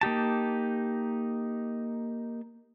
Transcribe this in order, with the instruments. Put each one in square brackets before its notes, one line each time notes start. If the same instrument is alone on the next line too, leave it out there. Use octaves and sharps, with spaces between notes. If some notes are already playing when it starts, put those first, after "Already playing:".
[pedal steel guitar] A#3 D#4 G4 A5